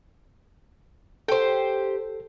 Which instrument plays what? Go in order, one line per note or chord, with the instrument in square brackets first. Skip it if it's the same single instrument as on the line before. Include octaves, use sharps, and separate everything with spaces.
[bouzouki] G4 C5 [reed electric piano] A4